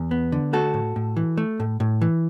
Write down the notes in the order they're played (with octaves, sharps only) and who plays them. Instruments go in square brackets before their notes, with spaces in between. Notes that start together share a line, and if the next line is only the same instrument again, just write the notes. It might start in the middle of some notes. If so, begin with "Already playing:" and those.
Already playing: [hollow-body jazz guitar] E2
B3
D3
A3 F#4 A4
A2
A2
E3
A3
A2
A2
E3